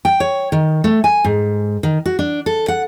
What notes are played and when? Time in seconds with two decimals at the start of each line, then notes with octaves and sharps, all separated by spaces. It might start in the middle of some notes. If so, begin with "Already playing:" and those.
0.05 G5
0.20 C#5
0.52 D#3
0.84 A3
1.04 G#5
1.25 G#2
1.83 D#3
2.06 F#4
2.19 D4
2.46 A4
2.68 F#5